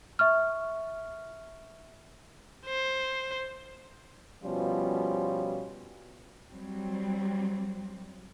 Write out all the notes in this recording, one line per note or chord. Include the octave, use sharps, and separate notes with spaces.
E5 C#6 F6
C5
B2 F3 G3 C#4 F4
F#3 G3 C4